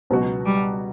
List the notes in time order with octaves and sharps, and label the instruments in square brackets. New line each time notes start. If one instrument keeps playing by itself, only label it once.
[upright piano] C#2 B2 F#3 B3 F#4
[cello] G3